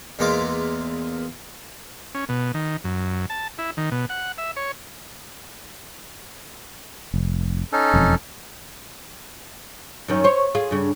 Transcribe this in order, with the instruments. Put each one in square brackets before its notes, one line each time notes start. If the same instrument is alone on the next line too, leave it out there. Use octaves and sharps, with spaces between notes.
[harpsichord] E2 E3 G#3 A#3 F4 D6
[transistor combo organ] C#4
B2
D#3
F#2
A5
E4
D#3
B2
F#5
E5
C#5
[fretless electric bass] F1
[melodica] C#4 D#4 A4
[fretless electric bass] E1 F2
[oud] F#2 D#3 C#4
C5 C#5
F4 G#4
G2 C#3